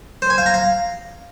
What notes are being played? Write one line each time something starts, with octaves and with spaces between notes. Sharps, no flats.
C5
G#5
F5
A#5
F5